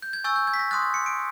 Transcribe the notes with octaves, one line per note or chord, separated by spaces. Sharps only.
G6
G#6
G#5 C#6 E6 G6 A6
G6
G#6
B6
A#6
C6 D#6 F#6 A6
A6
C#7
D7